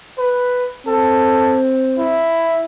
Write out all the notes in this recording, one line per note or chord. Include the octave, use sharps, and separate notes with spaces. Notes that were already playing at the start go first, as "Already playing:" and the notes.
B4
C4 A4
E4